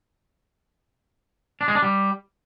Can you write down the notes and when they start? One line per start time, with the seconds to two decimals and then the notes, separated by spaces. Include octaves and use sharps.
1.61 D4
1.68 G#3
1.75 D4
1.83 G3